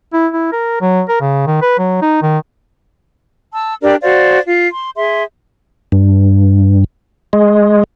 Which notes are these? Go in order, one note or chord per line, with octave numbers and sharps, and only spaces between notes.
E4
E4
A#4
F#3
A#4
C#3
D#3
B4
F#3
D#4
D#3
A5 E6
D4 G4 A#4 D5
F#4 C5 D5 F5
F4
C6
G#4 E5 C6
G2
G#3